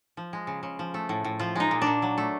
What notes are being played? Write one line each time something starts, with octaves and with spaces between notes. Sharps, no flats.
F3
G#3
C#3
C#3
F3
A3
A2
A2
F3 F4
G#3 D#4
A#2
D4
A#2
F#3
A3